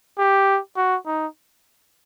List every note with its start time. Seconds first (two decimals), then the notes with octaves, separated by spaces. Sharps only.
0.19 G4
0.76 F#4
1.06 D#4